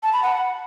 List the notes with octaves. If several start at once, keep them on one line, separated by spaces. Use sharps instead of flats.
A5
B5
F#5